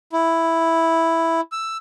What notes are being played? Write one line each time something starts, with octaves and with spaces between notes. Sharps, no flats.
E4
E6